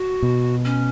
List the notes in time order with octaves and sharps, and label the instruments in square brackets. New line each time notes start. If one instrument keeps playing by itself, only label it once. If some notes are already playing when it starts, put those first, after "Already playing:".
Already playing: [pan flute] F#4
[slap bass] B2
[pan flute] C#4